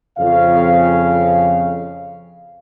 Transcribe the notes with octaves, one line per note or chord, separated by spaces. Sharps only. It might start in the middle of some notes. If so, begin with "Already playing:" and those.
F2 C#3 F5